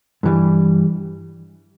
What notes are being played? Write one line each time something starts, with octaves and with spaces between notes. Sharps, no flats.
G2 E3 G3